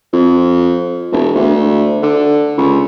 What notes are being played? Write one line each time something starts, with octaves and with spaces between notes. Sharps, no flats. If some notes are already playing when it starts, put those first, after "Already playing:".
F2
E1
D2
D3
C#2